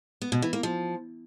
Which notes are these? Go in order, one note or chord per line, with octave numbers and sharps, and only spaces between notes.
B3
B2
E3
A#3
F3